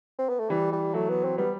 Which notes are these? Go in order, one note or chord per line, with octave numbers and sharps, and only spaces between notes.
C4
B3
A3
E3 G3
G3
F#3 A3
B3
C4
G3 B3